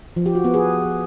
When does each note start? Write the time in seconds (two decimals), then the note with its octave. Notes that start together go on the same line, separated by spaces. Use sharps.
0.16 F3
0.26 G4
0.35 F#4
0.45 B3
0.54 G#4